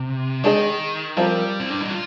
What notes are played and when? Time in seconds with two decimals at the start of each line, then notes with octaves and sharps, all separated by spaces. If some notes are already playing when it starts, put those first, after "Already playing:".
Already playing: C3
0.44 D#3 G#3 D4 G#4 D#5
1.17 F3 G3 C4 F4 A#4
1.60 C4
1.70 D4
1.81 D#4
1.90 F4